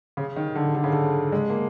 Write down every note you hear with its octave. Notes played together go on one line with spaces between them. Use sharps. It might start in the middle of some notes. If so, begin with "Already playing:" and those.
C#3
D#3
D3
D3
C#3
D3
G#3
A#3